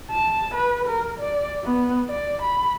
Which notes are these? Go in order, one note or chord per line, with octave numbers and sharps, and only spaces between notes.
A5
B4
A#4
D5
B3
D5
B5